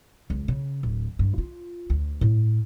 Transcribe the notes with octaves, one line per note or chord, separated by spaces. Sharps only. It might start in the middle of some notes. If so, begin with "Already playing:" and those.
C#2
C#3
D1
G2
F4
D2
A2